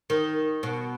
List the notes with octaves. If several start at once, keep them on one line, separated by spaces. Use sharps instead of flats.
D#3
B2